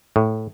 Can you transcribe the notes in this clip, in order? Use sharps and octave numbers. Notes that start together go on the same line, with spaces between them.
A2